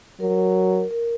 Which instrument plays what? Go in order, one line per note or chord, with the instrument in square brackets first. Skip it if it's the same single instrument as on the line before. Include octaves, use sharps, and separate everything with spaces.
[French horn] F#3 [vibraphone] A#4
[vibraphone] A#4